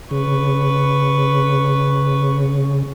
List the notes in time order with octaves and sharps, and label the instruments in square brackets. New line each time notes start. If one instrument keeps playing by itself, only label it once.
[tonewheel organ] C#3 [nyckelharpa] B4 C#6